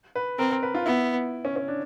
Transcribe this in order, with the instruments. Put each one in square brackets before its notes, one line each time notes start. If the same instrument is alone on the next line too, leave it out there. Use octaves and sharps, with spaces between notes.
[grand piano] B4
[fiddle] C4 [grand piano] A#4
[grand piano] A#4
B4
F4
[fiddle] B3 [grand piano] E4
[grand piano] C#4
C#4
D4